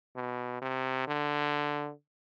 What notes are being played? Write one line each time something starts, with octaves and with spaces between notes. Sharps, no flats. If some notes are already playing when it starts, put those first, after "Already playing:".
B2
C3
D3